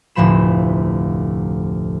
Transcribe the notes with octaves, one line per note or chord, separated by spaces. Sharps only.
F1 D2 A2 F3 B5 E7